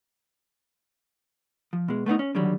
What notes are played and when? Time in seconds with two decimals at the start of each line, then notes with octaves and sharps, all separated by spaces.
1.73 F3
1.88 B2 G#3
2.06 A3 B3 C4 D#4
2.19 C#4
2.35 D3 D#3 F#3 G3